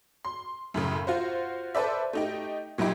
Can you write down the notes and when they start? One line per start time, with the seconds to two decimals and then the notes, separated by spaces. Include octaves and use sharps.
0.25 C6
0.74 F#2 A2 C#3
1.07 F4 F#4 C5
1.75 A4 B4 C5 D5 E5
2.13 A3 D#4 G4
2.78 A#2 F#3 D#4 E4 G4